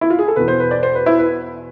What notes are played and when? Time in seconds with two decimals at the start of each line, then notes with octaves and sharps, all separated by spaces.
0.01 E4
0.10 F4
0.19 G#4
0.28 A4
0.36 E2 B2 B4
0.48 C5
0.60 B4
0.71 D5
0.83 C5
0.95 B4
1.06 E4
1.19 B4